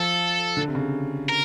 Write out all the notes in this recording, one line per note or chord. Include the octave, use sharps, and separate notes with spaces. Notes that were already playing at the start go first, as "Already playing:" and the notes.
Already playing: F3 A4
D3
C3
C#3
A#4